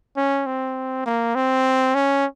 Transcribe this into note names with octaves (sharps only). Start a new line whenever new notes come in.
C#4
C4
A#3
C4
C#4